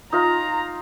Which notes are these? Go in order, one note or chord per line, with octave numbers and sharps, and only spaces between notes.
D#4 F4 F5 A#5